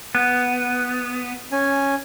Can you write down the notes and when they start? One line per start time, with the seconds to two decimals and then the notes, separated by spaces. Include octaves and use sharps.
0.15 B3
1.52 C#4 G#5